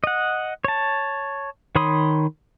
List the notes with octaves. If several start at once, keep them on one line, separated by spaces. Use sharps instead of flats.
D#5 F#5
C#5 A5
D#3 C#5 B5 C6 D#6